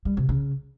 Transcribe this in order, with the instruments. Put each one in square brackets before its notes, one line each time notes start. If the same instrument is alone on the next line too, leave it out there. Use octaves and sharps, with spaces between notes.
[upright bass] G3
C3
C#3